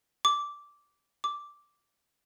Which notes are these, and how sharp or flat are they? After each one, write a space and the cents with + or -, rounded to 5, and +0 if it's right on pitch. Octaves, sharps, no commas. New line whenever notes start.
D6 -10
D6 -5